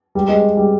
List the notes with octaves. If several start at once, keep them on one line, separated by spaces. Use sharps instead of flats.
G3
G#3
G3